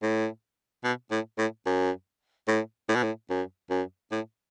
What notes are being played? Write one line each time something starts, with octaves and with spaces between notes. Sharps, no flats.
A2
B2
A2
A2
F#2
A2
A2
B2
A2
F#2
F#2
A2